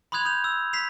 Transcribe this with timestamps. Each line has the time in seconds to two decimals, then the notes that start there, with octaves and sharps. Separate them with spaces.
0.12 B5 C6 D#6 F#6 G#6 F7
0.25 D#6 G6 F7
0.44 E6
0.73 B6 C7 F7